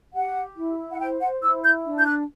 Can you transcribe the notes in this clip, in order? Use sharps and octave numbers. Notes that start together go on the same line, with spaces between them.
G4 F#5
E4
F#5
C5 G5
F#5
E4 E6
G6
D4
G6
F#6